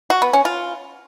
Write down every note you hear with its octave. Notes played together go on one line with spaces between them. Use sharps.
F#4
B3
C#4
F4